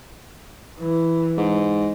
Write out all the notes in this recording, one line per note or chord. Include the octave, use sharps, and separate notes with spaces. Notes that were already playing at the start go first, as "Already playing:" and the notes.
E3
G#2